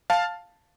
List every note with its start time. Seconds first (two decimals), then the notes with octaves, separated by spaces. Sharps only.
0.10 F5 A5